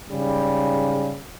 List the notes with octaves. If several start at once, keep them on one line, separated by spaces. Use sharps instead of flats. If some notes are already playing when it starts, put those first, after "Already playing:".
G#2 C#3 G3